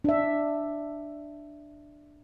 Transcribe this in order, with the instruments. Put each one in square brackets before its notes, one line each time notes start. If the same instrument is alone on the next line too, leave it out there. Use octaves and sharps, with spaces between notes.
[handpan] D4 E5